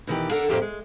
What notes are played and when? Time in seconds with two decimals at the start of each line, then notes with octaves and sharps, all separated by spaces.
0.07 B2 D#3 E3 G4
0.31 D4 A4 A#4 F#5
0.49 F2 A2 A#3 G4 E5
0.62 G#3